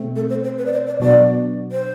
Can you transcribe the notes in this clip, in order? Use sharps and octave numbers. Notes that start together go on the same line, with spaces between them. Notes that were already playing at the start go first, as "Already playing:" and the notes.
Already playing: B2 A3 C4
A4
C5
C5
B4
D5
C5
D5
B2 F#3 B3 D4 F#4 D5
C5